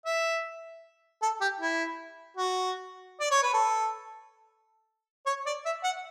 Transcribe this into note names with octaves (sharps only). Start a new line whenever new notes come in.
E5
A4
G4
E4
F#4
D5
C#5
B4
A4
C#5
D5
E5
F#5